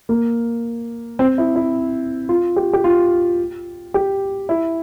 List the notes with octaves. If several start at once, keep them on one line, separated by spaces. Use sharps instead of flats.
A#3
C4
E4
E4
F4
G4
G4
F4
G4
E4